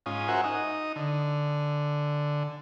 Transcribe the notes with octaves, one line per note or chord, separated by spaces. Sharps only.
G#2 C#4 F4 D#6
F#4 A#4 C5 E5 F#5 G#5
D#4 D#6
D3